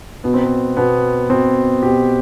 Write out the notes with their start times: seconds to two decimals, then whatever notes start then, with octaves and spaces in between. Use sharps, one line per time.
0.24 B2 B3
0.34 C4
0.44 B3
0.77 B2 B3
1.30 B2 C4
1.83 B2 G4